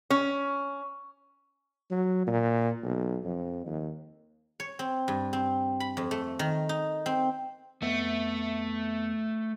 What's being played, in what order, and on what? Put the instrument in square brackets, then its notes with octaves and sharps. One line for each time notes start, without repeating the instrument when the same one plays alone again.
[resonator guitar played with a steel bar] C#4
[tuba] F#3
A#2
B1
F2
D#2
[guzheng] C#5
C4
G2
C4
B5
F2
A3
D#3
D#4
C4
[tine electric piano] F2 B3 E5 [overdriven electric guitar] A3